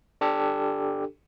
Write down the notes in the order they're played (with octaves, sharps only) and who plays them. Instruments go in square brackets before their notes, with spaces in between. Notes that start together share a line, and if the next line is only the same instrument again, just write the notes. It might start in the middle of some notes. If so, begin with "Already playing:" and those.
[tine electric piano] D4 G4 A4